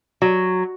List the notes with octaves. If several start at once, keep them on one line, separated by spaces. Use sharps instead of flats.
F#3